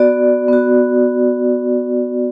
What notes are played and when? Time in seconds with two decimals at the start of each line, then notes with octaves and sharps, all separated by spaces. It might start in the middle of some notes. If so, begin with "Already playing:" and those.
Already playing: B3 F#4 D5
0.48 B3 F#4